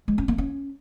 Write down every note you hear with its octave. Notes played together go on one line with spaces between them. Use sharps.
G#3
C#4
A#3
C#4